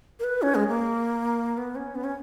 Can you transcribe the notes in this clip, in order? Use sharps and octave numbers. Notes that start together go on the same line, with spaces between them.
A#4
B4
C#4
G#3
A#3
B3
C#4
B3
C#4